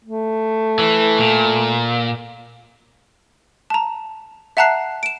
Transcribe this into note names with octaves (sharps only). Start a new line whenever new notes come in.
A3
E3
A#2
A5 A#5
E5 F#5 A5 A#5 F#6 C7
D7 E7